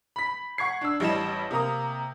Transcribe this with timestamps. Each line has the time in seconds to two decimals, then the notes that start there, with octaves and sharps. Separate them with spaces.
0.16 B5 B6
0.58 F#5 C#6 G#6 C7
0.81 D4 E6
1.00 A1 G3 E4 D#5 A5 E7
1.51 C3 A#3 A#5 D#6